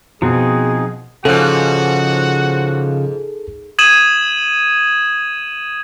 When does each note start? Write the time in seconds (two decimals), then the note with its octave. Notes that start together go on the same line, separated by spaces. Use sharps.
0.22 B2 F3 C4 D#4 G#4
1.25 G#2 C#3 F3 F#4 A4 F#5
3.79 D#6 G#6 D#7 E7 F#7